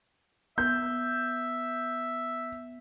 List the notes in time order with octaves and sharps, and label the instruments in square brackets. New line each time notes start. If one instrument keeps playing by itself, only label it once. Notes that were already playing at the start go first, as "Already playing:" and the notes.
[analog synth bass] B3 [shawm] E5 [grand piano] G6